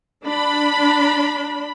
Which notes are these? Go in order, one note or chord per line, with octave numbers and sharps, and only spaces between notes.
D4 B5